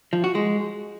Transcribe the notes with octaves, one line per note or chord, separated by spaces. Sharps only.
F3
F#4
G#3